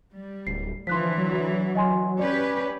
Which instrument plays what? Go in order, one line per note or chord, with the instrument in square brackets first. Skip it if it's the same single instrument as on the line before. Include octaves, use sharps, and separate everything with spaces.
[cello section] G3
[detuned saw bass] D1 [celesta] C7
[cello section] D3 E3 [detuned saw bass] F3 [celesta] C6 F#6 B6
[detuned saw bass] F#3
[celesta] D#5 G#5 C6
[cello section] C#4 G4 B4 [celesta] D5